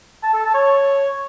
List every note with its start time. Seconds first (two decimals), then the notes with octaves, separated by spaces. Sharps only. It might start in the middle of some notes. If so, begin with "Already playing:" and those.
0.23 A5
0.34 A4
0.44 A5
0.55 C#5